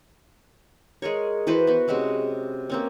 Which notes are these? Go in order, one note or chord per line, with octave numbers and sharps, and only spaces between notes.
G#3 G#4 A#4 C#5
E3 F#4 B4 C5
B3 F#4
C3 G#3 C#4 F#4
A#3 C4 C#4